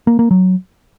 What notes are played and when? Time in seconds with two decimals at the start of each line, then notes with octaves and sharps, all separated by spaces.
0.07 A#3
0.19 A#3
0.31 F#3